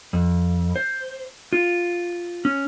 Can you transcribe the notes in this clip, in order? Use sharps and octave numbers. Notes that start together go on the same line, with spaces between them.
F2
C5
F4
C#4